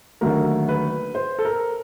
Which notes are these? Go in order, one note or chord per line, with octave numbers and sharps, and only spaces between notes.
D#2 D3 F#3 A3 A#4
B4
C5
A4
A#4